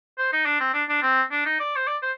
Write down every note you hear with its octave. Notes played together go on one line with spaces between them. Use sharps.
C5
D#4
D4
C4
D4
D4
C4
D4
D#4
D5
C5
D5
C5